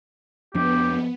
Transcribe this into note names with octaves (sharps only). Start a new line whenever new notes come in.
F2 F3 B3 D4 G4